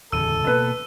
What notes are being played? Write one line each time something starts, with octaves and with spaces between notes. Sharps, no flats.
D1 E2 C#3 A4 E6 D#7
B2 A#3 B4